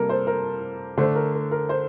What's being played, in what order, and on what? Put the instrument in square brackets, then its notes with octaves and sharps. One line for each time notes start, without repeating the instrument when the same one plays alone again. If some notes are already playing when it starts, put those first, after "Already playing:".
Already playing: [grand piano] C3 G3 A#3 [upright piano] A4 A#4
[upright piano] C5
A#4
[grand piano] D3 A3 D4 [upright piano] C5
[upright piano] A#4
A#4
A#4
C5